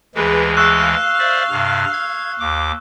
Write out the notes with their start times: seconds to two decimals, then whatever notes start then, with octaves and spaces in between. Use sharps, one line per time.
0.15 D2 E3 G#3 G#4 B4
0.57 F5 C#6 E6 F#6
1.19 C5 D5 E5
1.51 G2 C3
1.93 G#6
2.40 D#2 D6